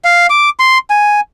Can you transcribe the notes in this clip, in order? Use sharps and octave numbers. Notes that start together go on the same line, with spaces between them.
F5
D6
C6
G#5